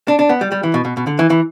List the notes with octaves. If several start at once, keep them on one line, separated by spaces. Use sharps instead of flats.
D4
D4
B3
G3
G3
E3
B2
B2
B2
D3
E3
E3